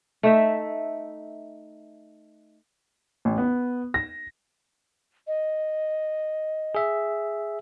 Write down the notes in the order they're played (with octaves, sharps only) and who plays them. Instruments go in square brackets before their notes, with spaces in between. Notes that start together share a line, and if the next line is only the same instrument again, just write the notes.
[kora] A3 D#4 E5
[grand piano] A1
B3
A#6
[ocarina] D#5
[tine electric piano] G#4 E5